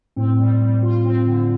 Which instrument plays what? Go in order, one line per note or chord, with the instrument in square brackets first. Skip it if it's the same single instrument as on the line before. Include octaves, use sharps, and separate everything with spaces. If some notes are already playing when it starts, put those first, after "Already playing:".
[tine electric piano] A2 [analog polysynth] C4
[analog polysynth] G3
G3
F4
C4
D3